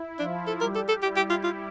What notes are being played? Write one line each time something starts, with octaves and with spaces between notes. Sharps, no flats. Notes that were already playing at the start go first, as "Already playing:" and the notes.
Already playing: E4
F3 D4 F4
A4
G3 G4 A#4
A4
A4
E4 G4
G4
F4
F4